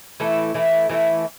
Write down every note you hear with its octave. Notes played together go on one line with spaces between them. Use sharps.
E3 A3 E4 A4
E3 A3 E4 A4
E3 A3 E4 A4